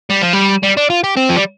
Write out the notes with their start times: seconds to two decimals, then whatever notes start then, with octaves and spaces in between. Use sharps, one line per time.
0.10 G3
0.22 F3
0.33 G3
0.63 G3
0.77 D4
0.90 F4
1.04 G4
1.17 C4
1.30 F3
1.37 G3